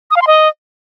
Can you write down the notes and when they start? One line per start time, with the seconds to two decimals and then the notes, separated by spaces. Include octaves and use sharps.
0.11 D#6
0.16 F5
0.22 C6
0.27 D#5